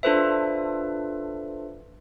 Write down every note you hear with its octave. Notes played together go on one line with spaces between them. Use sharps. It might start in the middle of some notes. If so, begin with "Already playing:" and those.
D4 F4 A4 B4 C5 E5